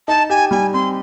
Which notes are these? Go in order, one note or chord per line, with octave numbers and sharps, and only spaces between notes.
D#4 A5
G4 G#5
G3 G#5
C4 C6